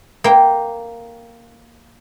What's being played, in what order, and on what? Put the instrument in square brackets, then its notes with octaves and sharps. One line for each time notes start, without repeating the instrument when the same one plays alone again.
[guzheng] A#3 G5